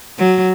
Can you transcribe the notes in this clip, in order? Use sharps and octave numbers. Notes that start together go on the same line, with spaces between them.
F#3